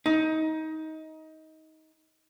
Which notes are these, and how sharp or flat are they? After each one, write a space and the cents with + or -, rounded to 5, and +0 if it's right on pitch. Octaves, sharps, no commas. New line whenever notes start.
D#4 +20